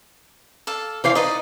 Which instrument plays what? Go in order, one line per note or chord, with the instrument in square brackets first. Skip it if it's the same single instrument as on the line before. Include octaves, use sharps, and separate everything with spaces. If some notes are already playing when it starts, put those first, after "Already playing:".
[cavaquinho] A4 D5 F5
[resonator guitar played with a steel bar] E3 C5 F5
[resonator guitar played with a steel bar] D#4 [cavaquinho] B4 D5 D#5